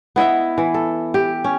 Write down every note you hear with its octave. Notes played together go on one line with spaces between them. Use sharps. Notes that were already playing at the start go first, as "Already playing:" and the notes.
B3 E4 D#5 E5
E3
A4
G4
C#4